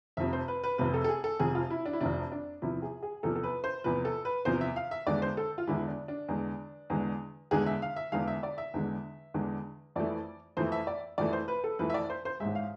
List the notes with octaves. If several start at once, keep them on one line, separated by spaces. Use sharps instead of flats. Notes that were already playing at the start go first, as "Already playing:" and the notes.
F1 F2 C3 E5
C5
B4
B4
F1 F2 C3 B4
A4
A4
G#4
A4
F1 F2 C3 G#4
F4
E4
D4
E4
F1 F2 C3 D4
D4
E2 C3 F3 E4
G#4
G#4
E2 C3 F3 A4
A4
B4
C5
E2 C3 F3 B4
A4
B4
E2 C3 F3 C5
E5
F5
E5
E2 D3 G#3 D5
C5
A4
F4
E2 D3 G#3 E4
D4
D4
E2 D3 G#3
E2 D3 G#3
E2 D3 G#3 G#4
E5
F5
E5
E2 D3 G#3 F5
E5
D5
E5
E2 D3 G#3
E2 D3 G#3
F2 E3 A3 D5
F2 E3 A3 C5
E5
D5
F2 E3 A3 D5
C5
B4
A4
F2 E3 A3 B4
E5
D5
C5
C5
A1 G#2 G#3 E5
F5